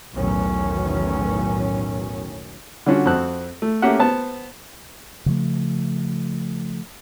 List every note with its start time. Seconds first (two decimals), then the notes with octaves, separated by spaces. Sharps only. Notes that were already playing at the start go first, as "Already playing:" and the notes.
0.13 B1 E2 A2 D#3 F#3 C#4
2.86 D3 G3 C#4 D4 F4 F#4
3.05 F2 C4 F#4 A5 F#6
3.62 A3
3.82 A3 A#3 C#4 G4 E5 F#5
4.00 B3 C5 A5
5.26 C#3 F3 A3